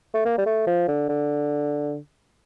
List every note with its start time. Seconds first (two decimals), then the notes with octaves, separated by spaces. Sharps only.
0.14 A3
0.25 A#3
0.38 G3
0.46 A3
0.67 F3
0.88 D3
1.09 D3